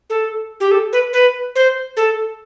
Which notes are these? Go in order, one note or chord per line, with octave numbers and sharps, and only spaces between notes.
A4
G4
A4
B4
B4
C5
A4